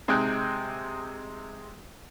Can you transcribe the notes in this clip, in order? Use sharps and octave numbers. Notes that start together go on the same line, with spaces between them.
C3 G#3 D#4 G5 F#6